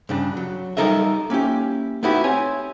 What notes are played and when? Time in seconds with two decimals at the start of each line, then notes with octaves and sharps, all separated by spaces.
0.09 G2 C#3 D4
0.37 F#3
0.77 G3 D#4 A4 A#4 D#5 E5
1.30 A#3 C#4 E4 G4
2.03 A3 B3 D#4 E4 F#4 G4
2.24 C4 C#5 G#5